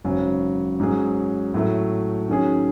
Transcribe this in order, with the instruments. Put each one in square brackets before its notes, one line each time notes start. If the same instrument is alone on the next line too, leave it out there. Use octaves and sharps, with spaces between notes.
[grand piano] G#1 F#2 C#3 F#3 C#4
G#2 F#3 C#4 G#4
A2 F#3 A3
D#3 F#3 C#4 G#4